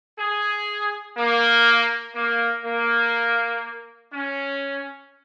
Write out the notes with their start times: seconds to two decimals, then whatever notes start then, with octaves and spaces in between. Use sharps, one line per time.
0.17 G#4
1.17 A#3
2.14 A#3
2.64 A#3
4.12 C#4